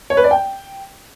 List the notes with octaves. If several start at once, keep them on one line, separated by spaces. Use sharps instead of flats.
C#5
B4
D5
G5